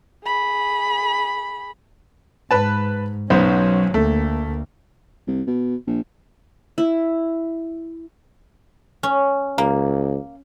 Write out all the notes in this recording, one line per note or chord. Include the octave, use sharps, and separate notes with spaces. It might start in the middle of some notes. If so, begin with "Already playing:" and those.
G#4 B5
G#2 B4 A5
B1 F#3 B3 C#4 C5
D2 A3 A#3
C2
B2
A#1
E4
C#4
C#2 A#3